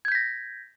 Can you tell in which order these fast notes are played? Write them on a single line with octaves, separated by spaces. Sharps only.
G#6 G6 B6 A#6